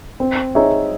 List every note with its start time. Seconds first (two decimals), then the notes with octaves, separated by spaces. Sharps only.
0.20 C4
0.55 D#4 G#4 C#5 E5